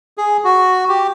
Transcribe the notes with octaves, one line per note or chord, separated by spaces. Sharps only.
G#4
F#4
G4